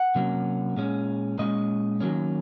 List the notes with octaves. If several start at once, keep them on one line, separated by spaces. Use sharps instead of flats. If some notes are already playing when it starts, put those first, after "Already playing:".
Already playing: F#5
C3 F#3 A#3 C#4
A#2 G#3 C#4
A#2 G#3 C#4 D#5
D#3 F#3 A#3 C#4